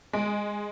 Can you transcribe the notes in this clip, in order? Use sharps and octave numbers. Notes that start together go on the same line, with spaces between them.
G#3